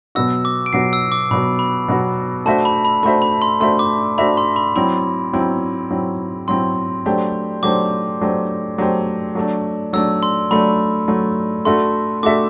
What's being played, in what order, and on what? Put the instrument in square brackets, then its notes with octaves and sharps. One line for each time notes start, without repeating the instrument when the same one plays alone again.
[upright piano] B2 F#3 B3 F#4 [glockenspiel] E6
[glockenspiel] D6
D7
[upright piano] B2 F#3 B3 F#4 [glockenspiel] C7
[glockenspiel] E6
D6
[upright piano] B2 F#3 B3 F#4 [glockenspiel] B5
[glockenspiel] B5
[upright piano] B2 F#3 B3 F#4
[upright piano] A3 D4 F#4 C5 E5 [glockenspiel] A5
[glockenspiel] B5
B5
[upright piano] A3 D4 F#4 C5 E5 [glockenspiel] B5
[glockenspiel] B5
C6
[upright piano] A3 D4 F#4 C5 E5 [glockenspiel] C6
[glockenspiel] D6
[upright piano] A3 D4 F#4 C5 E5 [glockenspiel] B5
[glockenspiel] C6
B5
[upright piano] F#3 C4 E4 [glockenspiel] B5
[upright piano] F#3 C4 E4
F#3 C4 E4
[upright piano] F#3 C4 E4 [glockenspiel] C6
[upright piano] F#3 A3 D4 G4 C5
[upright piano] F#3 A3 D4 G4 C5 [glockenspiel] D6
[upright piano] F#3 A3 D4 G4 C5
F#3 A3 D4 G4 C5
F#3 A3 D4
[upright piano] F#3 A3 D4 [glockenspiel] E6
[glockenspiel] C6
[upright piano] F#3 A3 D4 [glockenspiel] B5
[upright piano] F#3 A3 D4
[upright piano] A3 D4 F#4 A4 E5 [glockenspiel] C6
[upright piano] A3 D4 F#4 A4 E5 [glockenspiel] D6